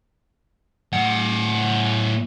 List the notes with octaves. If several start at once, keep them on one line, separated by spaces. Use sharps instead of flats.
A2 F#5